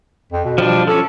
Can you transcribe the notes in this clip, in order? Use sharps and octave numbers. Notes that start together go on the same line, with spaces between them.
F2
B2
F3 G3 D4
F3 C#4 A4